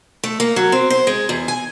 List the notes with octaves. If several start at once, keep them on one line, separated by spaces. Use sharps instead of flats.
A3
A#3
F#3
C4
C5
G#3
E2
G#5